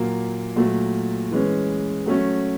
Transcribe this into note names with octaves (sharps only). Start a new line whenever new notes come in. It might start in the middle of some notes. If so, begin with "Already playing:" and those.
Already playing: A#2 F#3 A#3
A#2 F#3 A3
E3 G#3 C#4
F#3 A3 C#4